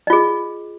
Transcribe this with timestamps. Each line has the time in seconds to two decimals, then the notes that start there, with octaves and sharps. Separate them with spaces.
0.07 D#5
0.10 F4
0.13 G#4